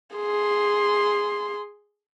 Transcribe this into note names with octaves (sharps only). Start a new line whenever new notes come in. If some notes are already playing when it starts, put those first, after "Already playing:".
G#4 C6